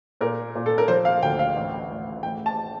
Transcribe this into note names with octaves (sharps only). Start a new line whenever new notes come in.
A#2 A#4
A#2
A4
A#4
F3 C5
F5
D2 G5
F5
A1
A1
A1 G5
A5